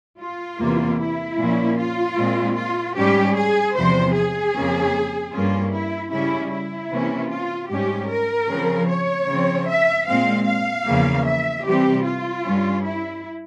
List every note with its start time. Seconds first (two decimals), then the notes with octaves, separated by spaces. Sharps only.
0.19 F4
0.59 E2 C3 E3 A#3
0.99 E4
1.37 A#2 F3 A#3 C#4
1.77 F4
2.17 A#2 G#3 C4
2.56 F4
2.96 G#2 G3 C#4 G4
3.36 G#4
3.75 E2 C3 F3 C5
4.14 G#4
4.54 F2 C#3 F3 A#3 C#4
5.32 G2 G3 A#3 C#4 F4
5.72 E4
6.11 C#3 G3 C#4 E4
6.51 E4
6.91 C3 E3 A#3 C#4
7.30 F4
7.69 G#2 G3 C#4 G4
8.09 A#4
8.49 C#3 F3 C4
8.88 C#5
9.28 C#3 F3 C4
9.67 E5
10.06 A#2 G#3 C4 F5
10.46 F5
10.86 E2 C#3 F3 A#3
11.26 E5
11.65 C3 E3 G3 C4 G4
12.04 F4
12.44 G2 G3 C#4
12.84 E4